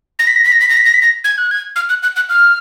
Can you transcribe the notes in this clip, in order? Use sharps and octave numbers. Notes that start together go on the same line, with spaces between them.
A#6
B6
A#6
B6
A#6
B6
A#6
B6
A#6
B6
A#6
G#6
F#6
G#6
F6
F#6
F#6
F#6
F6